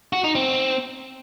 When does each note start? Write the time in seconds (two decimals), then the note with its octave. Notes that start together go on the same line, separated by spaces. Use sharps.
0.13 F#4
0.24 D#4
0.35 C4